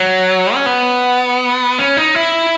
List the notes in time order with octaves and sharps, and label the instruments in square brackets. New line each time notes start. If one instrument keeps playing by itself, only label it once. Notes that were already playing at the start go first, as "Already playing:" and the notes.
Already playing: [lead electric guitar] F#3
C#4
B3
C#4
D#4
E4